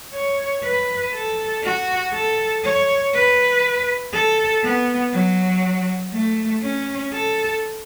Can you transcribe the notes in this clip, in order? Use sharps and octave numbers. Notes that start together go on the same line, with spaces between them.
C#5
B4
A4
F#4
A4
C#5
B4
A4
B3
F#3
A3
C#4
A4